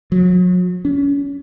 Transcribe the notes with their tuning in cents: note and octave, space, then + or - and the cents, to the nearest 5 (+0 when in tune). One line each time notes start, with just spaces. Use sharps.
F#3 -40
C#4 +30